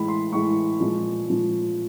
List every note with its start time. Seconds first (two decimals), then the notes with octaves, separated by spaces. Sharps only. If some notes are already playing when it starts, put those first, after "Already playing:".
Already playing: A2 E3 G#3 B5
0.08 C6
0.32 A2 E3 G#3 C#6
0.80 A#2 F3 G#3
1.28 A#2 F3 G#3